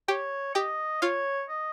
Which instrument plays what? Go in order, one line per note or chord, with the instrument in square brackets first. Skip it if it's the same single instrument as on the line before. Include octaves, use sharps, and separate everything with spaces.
[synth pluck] G4 G5 [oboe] C#5
[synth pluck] G4 G5 [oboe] D#5
[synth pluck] F4 F5 [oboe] C#5
[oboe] D#5